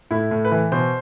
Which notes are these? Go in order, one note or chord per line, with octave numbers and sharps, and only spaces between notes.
A2 E4
A2
B4
E3
B2 C5